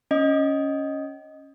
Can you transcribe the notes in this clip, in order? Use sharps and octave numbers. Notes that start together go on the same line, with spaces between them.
C#4 D#5